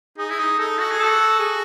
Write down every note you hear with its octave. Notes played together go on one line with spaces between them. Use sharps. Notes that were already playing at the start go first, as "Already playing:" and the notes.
D#4 G#4
E4
D#4
D#4 A4
F#4
G#4
F#4 A4
G#4